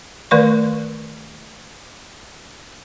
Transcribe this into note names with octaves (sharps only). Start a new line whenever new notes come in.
D#3 A3 B4 D5 C#6